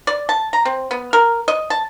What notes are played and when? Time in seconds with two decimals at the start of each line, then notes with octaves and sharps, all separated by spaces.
0.07 D5
0.29 A5
0.53 A#5
0.65 C4
0.91 B3
1.13 A#4
1.48 D#5
1.70 A5